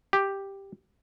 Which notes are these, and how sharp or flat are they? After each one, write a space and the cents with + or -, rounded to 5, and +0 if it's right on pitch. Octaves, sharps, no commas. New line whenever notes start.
G4 +0